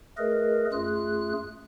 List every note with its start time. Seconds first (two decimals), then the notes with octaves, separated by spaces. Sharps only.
0.17 A3 G#4 A#4 B4 D#5
0.72 F#2 A3 F4 G#4 F#6